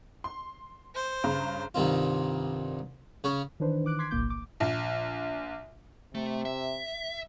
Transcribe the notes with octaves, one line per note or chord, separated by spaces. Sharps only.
C6
C5
G2 C#3 A#5
C2 G2 D#3 C4 F4
C#3 C#4 C#6
D#3 E3 D4 B4 C5
D#3 E3 D6 F#6 D7
C6 D6 F#6 G#6 B6 C7
G1 C2 A#2 A#3 D6 G6
D6
A#1
C3 A3
E5